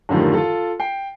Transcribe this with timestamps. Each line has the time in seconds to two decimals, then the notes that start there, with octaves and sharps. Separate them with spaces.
0.09 F#2 A2 D3 D#3 F3 G3
0.34 F4 A4
0.80 G5 C7